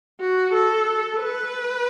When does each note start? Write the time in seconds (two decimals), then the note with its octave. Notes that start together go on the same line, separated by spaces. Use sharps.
0.21 F#4
0.54 A4
1.21 B4